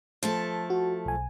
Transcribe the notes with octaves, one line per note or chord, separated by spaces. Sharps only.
F3 A3 A4
F#4
B1 G#5